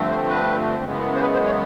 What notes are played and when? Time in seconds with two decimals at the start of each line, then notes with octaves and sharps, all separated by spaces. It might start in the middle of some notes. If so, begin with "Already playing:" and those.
Already playing: G2 D3 F3 A3 C4
0.10 C5
0.28 B4
0.84 F#2 C#3 E3 G#3 B3
1.16 C5
1.21 B4
1.33 C5
1.46 C#5